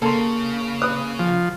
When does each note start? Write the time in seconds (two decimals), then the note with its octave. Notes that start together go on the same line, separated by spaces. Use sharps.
0.02 C#3 A#3 A4 C6
0.82 B4 D#6 F#6
1.19 F3